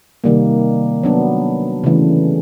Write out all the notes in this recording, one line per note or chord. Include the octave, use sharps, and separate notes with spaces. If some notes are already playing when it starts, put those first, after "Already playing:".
C3 D#3 G3 A#3
F#3 B3 D4
C#3 E3 A3